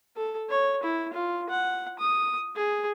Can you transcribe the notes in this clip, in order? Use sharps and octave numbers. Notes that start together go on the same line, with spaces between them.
A4
C#5
E4
F4
F#5
D#6
G#4